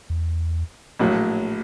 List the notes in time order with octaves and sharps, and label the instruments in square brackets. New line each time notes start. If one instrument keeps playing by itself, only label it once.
[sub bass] E2
[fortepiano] A#1 A2 F#3